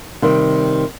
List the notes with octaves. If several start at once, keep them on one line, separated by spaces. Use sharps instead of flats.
C3 D#3 G3 C4